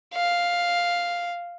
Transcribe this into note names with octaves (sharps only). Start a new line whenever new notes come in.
F5